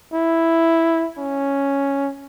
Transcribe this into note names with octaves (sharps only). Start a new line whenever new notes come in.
E4
C#4